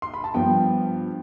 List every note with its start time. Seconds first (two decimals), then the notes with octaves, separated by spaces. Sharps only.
0.02 C6
0.14 B5
0.24 A5
0.34 G2 F3 B3 G5